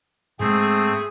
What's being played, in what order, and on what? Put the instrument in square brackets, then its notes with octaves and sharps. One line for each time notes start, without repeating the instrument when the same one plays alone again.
[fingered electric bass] G#2 G#3 [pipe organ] A3 C4 [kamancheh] G#4